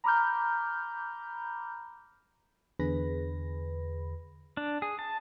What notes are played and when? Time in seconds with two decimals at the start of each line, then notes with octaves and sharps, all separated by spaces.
0.04 A#5 B5 D6 F6 G6
2.79 E2 D3 G#4 B4 B5 A#6
4.57 D4
4.82 G#4
4.99 A5